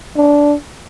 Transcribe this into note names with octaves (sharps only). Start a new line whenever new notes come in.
D4